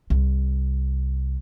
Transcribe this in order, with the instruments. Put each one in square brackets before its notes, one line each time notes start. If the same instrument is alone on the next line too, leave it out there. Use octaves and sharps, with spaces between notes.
[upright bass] C2